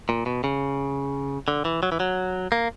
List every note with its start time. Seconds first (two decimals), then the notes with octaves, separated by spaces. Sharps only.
0.09 A#2
0.26 B2
0.44 C#3
1.48 D3
1.65 E3
1.83 F#3
1.92 E3
2.00 F#3
2.52 A#3